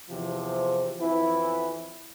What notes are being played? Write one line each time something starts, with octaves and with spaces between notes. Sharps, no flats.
E2 C3 F3
F2 E3 B3 E4